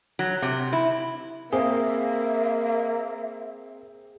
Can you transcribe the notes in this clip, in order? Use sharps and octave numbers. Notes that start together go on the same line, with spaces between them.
F#3
C3
E4
A#3 C4 G#4 E5